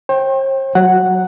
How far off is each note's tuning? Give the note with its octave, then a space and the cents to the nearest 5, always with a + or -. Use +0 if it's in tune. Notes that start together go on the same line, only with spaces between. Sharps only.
C5 +45 G5 +0
F#3 +0 F#5 +0